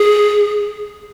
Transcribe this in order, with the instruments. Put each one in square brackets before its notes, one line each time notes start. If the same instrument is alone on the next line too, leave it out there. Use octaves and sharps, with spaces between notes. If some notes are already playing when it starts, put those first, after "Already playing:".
Already playing: [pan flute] G#4